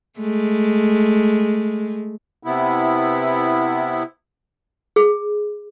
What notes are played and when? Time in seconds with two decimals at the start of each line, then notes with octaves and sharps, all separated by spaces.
0.19 G#3 A3
2.43 C3 B3 E4
4.96 G#4